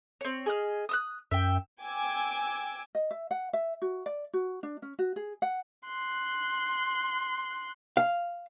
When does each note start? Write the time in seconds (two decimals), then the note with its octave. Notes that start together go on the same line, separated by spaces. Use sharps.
0.21 C4 C#5
0.46 G#4 D#5 F6
0.89 D#6 E6 F#6
1.31 F#2 E5 G5
1.83 G5 G#5 D6 E6 G#6
2.95 D#5
3.11 E5
3.31 F#5
3.53 E5
3.82 F#4
4.06 D5
4.33 F#4
4.63 D4
4.82 C#4
4.99 F#4
5.16 G#4
5.42 F#5
5.87 C6 F#6
7.97 F5